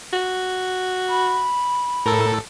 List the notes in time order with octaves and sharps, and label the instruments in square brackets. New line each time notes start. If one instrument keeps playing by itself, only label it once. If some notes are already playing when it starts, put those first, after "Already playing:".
[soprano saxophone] F#4
[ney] B5
[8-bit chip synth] A2 A4 [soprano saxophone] A#4